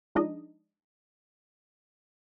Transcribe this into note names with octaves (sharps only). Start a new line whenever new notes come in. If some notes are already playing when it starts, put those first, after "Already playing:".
F3 G#3 D4 D#4 D#5